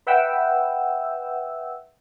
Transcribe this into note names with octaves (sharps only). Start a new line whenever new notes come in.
B4 E5 F#5 G5 E6